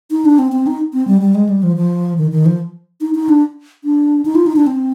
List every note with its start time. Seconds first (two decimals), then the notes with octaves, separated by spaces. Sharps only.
0.11 D#4
0.25 D4
0.39 C4
0.52 C4
0.67 D#4
0.93 C4
1.08 G3
1.21 G3
1.35 G#3
1.49 G3
1.63 F3
1.76 F3
2.18 D#3
2.31 D#3
2.46 F3
3.01 D#4
3.15 D#4
3.29 D4
3.84 D4
4.25 D#4
4.35 F4
4.46 D#4
4.56 D4
4.67 C4